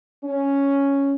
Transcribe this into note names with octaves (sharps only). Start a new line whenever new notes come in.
C#4